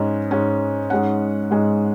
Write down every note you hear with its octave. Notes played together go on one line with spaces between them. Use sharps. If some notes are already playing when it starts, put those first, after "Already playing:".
Already playing: G#2 G#3 C#4
G#2 G#3 C#4
G#2 G#3 C#4 F#5
G#2 G#3 C#4